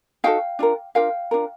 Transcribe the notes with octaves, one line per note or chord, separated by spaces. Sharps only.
D#4 F#4 A4 F5 G5
D4 F4 A#4
D4 F4 A#4 F5 G5
D4 F4 A#4